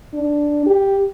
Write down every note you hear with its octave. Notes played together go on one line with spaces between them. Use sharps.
D4
G4